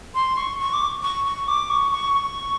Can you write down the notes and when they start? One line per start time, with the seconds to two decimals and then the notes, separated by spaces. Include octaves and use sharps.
0.15 C6
0.37 C#6
0.59 C#6
0.73 D6
1.03 C#6
1.25 C#6
1.48 D6
1.70 C#6
1.92 C#6
2.14 C#6